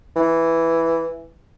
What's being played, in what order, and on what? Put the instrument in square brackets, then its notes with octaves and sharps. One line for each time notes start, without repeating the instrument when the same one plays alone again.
[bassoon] E3